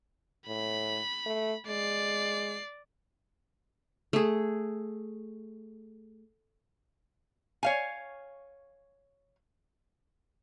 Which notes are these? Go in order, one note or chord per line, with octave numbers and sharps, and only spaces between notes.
A2 B5
A3
G#3 D5 C7
A3 G#4
C#5 F5 G#5